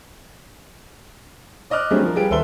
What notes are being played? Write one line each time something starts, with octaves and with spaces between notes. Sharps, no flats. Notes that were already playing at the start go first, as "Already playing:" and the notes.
D5 D#5 D6 F6 F#6
F#3 G3 A3 C4 D4 G#4
F3 A#4
G3 F4 G4 G#4 B4 D7
D#1 A4 B4 E5 C6 G7